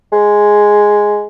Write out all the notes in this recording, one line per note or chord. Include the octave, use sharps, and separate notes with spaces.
G#3